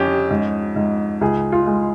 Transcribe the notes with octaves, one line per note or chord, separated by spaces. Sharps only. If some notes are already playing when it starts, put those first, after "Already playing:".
Already playing: F2 C#4 G4
G#2
G#2
C#2 G#4
F4
G#3